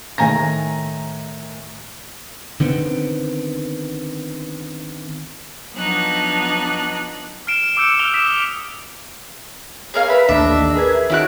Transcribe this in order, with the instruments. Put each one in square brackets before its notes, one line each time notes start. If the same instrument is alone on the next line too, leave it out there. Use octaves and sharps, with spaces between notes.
[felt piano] A2 D#3 G#5 A#5 A#6
[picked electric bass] D3 D#3 B3 C4
[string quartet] F3 F#3 B3 D4 D#4 F#6
[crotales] F6 C7 D7 E7
D6 E6 G6 C#7
E6 F6 D7 E7 F7 G7
D#6 E6 B6 D7 E7
[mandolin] G#4 A#4 F5 [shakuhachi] C#5
[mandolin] A#4 B5 [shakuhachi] B4 [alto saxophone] E5
[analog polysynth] A1 D#2 A4 [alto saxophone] D4 [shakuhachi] D#5 [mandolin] E5
[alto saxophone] G#4 [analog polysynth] A#4 G#6 [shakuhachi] B4
[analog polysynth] D#3 D7 [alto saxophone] C#4 [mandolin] E4 E6 F#6 [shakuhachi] F#4